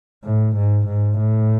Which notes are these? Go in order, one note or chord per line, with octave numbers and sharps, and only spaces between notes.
A2
G#2
G#2
A2